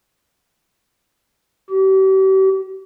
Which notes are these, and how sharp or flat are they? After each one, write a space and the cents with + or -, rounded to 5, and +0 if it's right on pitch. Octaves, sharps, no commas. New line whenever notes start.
G4 -40